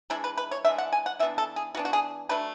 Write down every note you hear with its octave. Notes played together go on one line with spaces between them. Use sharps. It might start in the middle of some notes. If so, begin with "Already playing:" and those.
E3 G#3 D4 E4
B4
B4
C#5
E3 G#3 D4 E5
F#5
G#5
F#5
E3 B3 D4 E5
A4
G#4
E3 B3 D4 F#4
F#4
G#4
F#3 A3 D4 B4